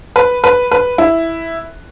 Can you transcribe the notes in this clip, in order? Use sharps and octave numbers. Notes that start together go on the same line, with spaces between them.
B4
B4
B4
E4